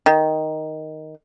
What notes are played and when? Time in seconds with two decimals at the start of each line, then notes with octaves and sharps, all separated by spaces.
0.06 D#3